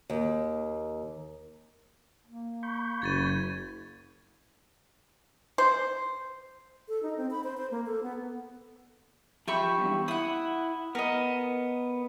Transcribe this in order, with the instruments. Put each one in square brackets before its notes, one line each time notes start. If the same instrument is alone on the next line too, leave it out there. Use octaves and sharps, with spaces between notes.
[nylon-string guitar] D#2
[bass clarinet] A#3
[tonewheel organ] B5 C#6 G6
[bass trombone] F#1 [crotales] G#6 A6 D#7
[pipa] C5
[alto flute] A4
D#4
C4
B5
C5
C5
A#3
A4
B3
[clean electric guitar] F3 B5 [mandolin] G4 E5 C#6
[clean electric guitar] E2 G2
[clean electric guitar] E4 [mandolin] F#5 D#6
[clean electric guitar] B3 [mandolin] A#4 D#5